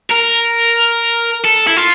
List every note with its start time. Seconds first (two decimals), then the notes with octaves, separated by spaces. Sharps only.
0.11 A#4
1.45 A4
1.68 E4
1.77 F4